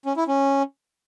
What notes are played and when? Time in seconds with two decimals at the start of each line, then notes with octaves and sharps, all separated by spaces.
0.06 C#4
0.17 E4
0.28 C#4